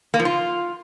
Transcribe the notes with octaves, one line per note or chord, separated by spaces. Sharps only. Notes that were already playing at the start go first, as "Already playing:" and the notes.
A#3
F3
F4